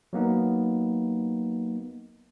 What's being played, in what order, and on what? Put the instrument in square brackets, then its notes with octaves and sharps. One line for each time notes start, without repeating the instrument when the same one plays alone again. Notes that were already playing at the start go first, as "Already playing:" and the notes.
[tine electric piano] F#3 A#3 B3 D#4